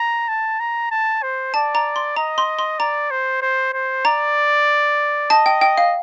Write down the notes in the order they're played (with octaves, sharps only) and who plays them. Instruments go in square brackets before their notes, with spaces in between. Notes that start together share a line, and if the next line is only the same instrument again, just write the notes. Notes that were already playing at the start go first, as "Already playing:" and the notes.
Already playing: [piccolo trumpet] A#5
A5
A#5
A5
C5
[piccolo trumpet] D5 [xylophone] A5
[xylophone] A#5
C6
[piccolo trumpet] D#5 [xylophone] A#5
[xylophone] C6
C6
[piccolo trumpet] D5 [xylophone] A#5
[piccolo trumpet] C5
C5
C5
[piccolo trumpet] D5 [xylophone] A#5
[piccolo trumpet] D#5 [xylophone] A5
[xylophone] G5
G5
F5